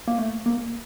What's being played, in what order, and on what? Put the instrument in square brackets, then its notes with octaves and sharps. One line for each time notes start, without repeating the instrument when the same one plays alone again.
[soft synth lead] A#3
A3
A#3